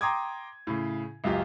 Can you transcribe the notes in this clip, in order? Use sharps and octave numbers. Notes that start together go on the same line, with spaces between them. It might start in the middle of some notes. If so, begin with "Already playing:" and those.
G5 A#5 C6 D6 D#6 G#6
A2 C#3
C#2 F#2 F4 G4